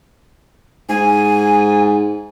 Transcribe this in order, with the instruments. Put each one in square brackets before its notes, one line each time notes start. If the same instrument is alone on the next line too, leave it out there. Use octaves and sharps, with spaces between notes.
[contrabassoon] G#2 [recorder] G#5